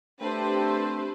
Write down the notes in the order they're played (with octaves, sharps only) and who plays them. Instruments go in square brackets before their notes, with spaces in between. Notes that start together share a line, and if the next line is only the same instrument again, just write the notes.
[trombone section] A3 C4 [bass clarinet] D4 [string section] G4 B4 C5